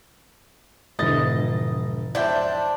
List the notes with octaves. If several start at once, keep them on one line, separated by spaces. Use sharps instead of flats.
E1 G#2 D3 F3 E4 D#5 A6
D4 E4 C5 D5 E5 G5